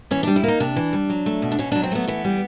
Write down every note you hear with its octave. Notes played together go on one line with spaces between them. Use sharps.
E3 C#4
G3 D4
E4
A#3 D#4
C3 D4
E3
G3
F#3
A3
B2
D4
B2 C#4
F#3 D4
C4
A3 B3
E3 B3
G3